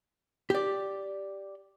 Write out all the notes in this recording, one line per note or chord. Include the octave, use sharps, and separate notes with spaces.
G4 D5